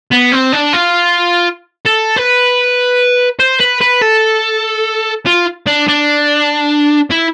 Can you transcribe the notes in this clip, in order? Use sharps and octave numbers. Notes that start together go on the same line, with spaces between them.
B3
C4
D4
F4
A4
B4
C5
B4
B4
A4
F4
D4
D4
E4